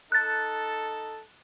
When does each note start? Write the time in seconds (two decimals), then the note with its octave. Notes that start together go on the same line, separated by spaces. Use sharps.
0.12 D#4 A4 F#6 A6